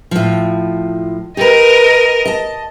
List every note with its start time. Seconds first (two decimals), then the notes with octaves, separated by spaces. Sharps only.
0.11 A2 F3
1.37 G4 A#4 B4 D#5
2.25 D#5 A5